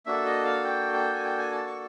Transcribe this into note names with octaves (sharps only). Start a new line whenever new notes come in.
A#3 D4 F#4 A4 E5
D#5
F5
G5
G5
G#5
G5
G#5
A5
C#6